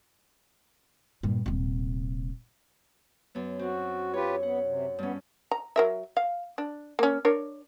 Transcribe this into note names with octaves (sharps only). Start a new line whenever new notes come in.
G2 A#2
D#1 C3
F#2 B3
C4 F#4
F4 G4 B4 C#5
B3 F#5
C3
G2 B3 C#4
A#5
F#3 A#4 E5
F5
D4
A#3 C#4
D4 A#4 C#5